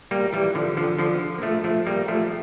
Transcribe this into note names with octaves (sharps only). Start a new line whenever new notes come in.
G3 A#3
E3 G3
D3 F3
D3 F3
D3 F3
A#3
F3 A3
F3 A3
G3 A#3
F3 A3